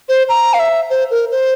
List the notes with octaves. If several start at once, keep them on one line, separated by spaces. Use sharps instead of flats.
C5
A#5
F5
E5
C5
A#4
C5